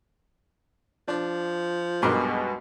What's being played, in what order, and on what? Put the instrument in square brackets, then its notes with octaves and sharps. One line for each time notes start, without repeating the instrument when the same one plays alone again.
[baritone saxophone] F3 [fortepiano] D4
[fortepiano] B1 G2 A#4 [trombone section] B2 G#3